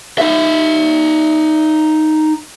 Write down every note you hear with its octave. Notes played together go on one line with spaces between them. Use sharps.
D#4 E5